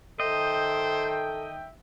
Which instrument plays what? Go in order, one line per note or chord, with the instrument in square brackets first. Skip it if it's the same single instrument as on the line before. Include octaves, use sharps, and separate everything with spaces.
[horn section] D#3 E5 G5 [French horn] A4 [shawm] C5 [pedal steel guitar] D#5